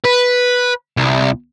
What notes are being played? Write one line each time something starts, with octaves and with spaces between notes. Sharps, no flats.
B4
C2